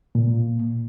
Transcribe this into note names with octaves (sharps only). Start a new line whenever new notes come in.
A#2